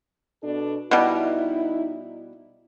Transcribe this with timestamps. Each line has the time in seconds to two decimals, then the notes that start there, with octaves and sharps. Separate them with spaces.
0.43 B2 D4 A4
0.91 B2 G3 D#4 E4